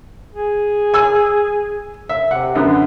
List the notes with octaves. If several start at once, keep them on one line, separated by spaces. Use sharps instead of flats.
G#4
G#5 E6
E5
C3 F#5
F#2 D3 B3